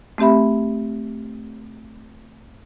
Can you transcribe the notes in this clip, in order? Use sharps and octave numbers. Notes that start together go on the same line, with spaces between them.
A3 C4 G4 E5 B5